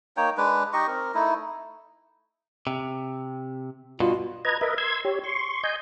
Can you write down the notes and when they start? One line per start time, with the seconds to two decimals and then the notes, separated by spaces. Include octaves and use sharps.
0.17 A#3 D#4 C#5 G5
0.37 G#3 D4 B4
0.73 D#4 G4 D#5 C#6
0.87 C4 A#4
1.14 A3 D#4 E4
2.67 C3
4.00 G2 B2 F4 F#4
4.45 B4 D#5 A#5 G#6
4.61 A#4 B4 D#5 E5
4.78 C6 E6 G#6
5.05 G4 C#5
5.23 C6 C#6
5.63 D#5 G#5 G6